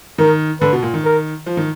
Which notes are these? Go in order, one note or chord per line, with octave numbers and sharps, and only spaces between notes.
D#3 A#4
D3 B4
B2
A#2
D#3
A#4
F3
D#3